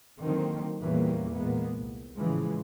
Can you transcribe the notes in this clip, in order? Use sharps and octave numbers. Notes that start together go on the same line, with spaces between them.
D3 D#3 F#3 A#3 C4
E2 A#2 E3 G3 A#3 C#4
A#2 G#3 A#3 B3
C2
A2 C#3 E3 F3 G#3